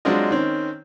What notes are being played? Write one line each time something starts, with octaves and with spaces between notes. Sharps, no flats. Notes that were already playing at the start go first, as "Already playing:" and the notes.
F#3 G#3 C4 D4 F4 D#5
D#3 C4 C#4